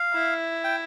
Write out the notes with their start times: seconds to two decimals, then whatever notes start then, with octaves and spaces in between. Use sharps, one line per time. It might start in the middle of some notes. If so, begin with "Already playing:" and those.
Already playing: F5
0.14 E4
0.64 G5